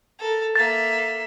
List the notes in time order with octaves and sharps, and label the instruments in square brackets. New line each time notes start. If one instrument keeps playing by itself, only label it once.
[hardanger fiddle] A4 A#4
[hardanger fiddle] A#3 E5 [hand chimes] A6